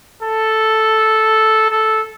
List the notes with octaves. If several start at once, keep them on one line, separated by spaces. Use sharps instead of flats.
A4
A4